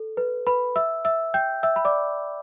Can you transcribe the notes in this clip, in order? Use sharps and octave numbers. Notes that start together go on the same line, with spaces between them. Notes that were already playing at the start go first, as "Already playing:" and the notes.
Already playing: A4
B4
B4 B5
E5 E6
E5 E6
G5 G6
E5 E6
B5
D5 D6